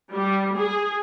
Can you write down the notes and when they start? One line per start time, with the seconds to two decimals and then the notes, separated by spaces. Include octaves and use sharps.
0.14 G3
0.56 G#4